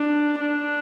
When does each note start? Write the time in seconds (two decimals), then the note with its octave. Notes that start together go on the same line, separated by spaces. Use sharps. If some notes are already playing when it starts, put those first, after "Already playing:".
Already playing: D4
0.41 D4